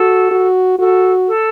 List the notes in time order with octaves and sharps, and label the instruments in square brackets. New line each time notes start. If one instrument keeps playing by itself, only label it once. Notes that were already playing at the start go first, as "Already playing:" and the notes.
Already playing: [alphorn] F#4 [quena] A4
[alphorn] F#4
[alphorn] F#4 [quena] A4
[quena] A4